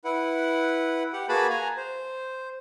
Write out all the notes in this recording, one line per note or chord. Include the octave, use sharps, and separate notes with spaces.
E4 B4 F#5
G4 F#5
A#3 F#4 G#4 B4 A5 B5
G#5 A#5
C5